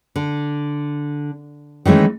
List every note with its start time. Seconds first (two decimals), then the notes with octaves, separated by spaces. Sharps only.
0.16 D3
1.85 D#3 E3 G#3 A3 C#4